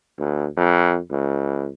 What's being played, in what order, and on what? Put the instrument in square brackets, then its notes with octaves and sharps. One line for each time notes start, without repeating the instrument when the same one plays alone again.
[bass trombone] D2
F2
C#2